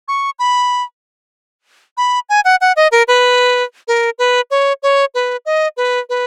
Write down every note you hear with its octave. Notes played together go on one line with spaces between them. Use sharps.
C#6
B5
B5
G#5
F#5
F#5
D#5
A#4
B4
A#4
B4
C#5
C#5
B4
D#5
B4
B4